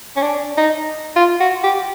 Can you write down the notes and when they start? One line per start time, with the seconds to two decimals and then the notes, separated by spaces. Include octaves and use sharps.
0.16 C#4
0.22 D4
0.58 D#4
1.16 F4
1.40 F#4
1.64 G4